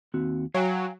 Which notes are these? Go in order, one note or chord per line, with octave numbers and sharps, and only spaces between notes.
D#2 C4 F#4
F#3 F5 G5 G#5